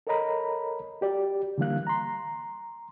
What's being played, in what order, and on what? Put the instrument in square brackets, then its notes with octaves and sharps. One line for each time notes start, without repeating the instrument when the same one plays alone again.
[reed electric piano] A4 A#4 C#5 D#5 A#5 B5
F#4 G4 D5
D3 E3 G3 A#3 F5 F#6
A#5 C6